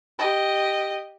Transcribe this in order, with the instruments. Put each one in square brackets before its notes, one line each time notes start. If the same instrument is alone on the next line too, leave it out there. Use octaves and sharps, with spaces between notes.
[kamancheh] G4 D#5